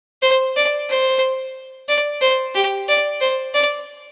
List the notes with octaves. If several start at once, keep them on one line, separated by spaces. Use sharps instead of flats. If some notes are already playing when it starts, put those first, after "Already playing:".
C5
D5
C5
D5
C5
G4
D5
C5
D5